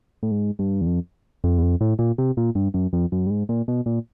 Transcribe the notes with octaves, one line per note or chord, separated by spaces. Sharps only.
A2
G#2
G2
E2
F2
F2
E2
F2
A2
A#2
C3
A#2
G2
F#2
F2
F#2
G2
G#2
A#2
B2
A#2